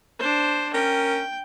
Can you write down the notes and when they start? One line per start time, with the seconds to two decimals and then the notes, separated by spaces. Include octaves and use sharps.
0.20 D4 C5
0.74 C#4 A#4 G5